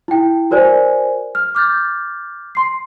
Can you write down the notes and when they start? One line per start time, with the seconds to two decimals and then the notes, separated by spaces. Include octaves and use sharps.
0.08 E4 G5
0.51 F#4 A#4 C5 D5 G#5
1.35 F6
1.55 D6 F6 G6 A6
2.55 C6 C7